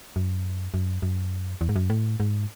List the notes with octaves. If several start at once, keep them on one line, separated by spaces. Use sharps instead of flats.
F#2
F#2
F#2
E2
G#2
F#2
A2
G#2